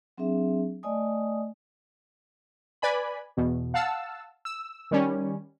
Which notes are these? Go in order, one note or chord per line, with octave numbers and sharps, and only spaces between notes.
F#3 C4 D4 G#4 E5
A3 D5 D#5 G#5 D#6
B4 D5 G#5 B5
E2 B2
F5 F#5 A5 E6
E6
D#3 G3 C#4